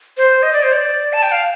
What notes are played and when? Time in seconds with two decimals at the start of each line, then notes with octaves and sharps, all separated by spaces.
0.17 C5
0.43 D#5
0.53 D5
0.63 C5
0.73 D5
1.13 A5
1.23 G5
1.32 F5